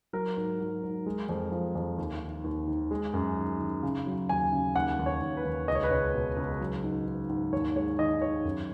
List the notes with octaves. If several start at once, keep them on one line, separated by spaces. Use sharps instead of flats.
F#3 A#4
G#2
F#3
G#2
G#3
F2
F3
F2
D#2
D#3
D#2
D#3
G#3
F#2
D#3
D#3
C#3
F#3
D#2 G#5
C#3
D#2 F#5
D#2
C#5
D#2
B4
D#2
C#2 D#5
C#5
B4
C#2 C#5
B2
C#2
F#3
G#2
G#2
G#2
D#2 C#5
G#3 C#5
D#3 D#5
D#3 C#5
F#2